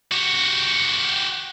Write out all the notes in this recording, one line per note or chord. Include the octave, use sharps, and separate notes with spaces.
F#4 G4